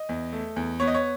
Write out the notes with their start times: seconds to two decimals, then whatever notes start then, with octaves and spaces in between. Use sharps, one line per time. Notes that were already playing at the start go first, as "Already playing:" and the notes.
Already playing: D#5
0.09 E2
0.33 A3
0.56 E2
0.80 B3 C#5
0.87 D#5
0.94 C#5